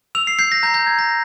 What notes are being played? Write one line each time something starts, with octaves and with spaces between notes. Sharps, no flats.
E6 F7
C7
G6 C7
A#6
A#5 G6
G6
A#5 G#6
A#6